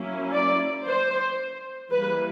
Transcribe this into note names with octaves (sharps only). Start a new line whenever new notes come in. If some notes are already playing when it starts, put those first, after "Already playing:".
Already playing: F#3 A#3 C#4 E4
D5
C5
E3 G3 A#3 B4